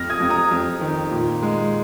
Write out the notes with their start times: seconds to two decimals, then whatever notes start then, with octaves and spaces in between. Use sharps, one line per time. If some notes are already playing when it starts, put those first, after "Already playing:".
Already playing: F2 F6 A#6
0.10 D#6 G#6
0.20 F2
0.30 A#5 D#6
0.51 F2
0.81 D#3
1.11 A#2
1.42 G#3